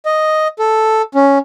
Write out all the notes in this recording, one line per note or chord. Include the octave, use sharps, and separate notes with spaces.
D#5
A4
C#4